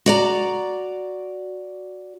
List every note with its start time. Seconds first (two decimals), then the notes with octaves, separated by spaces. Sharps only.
0.06 F#4 D5 A#5